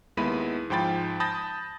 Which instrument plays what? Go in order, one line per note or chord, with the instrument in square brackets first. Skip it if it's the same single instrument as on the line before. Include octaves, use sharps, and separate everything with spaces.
[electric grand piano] D#2 G#3 B3 E4 B5 D#7
G#2 F3 G5 B5 A6
A5 B5 D#6 G6 A6 A#6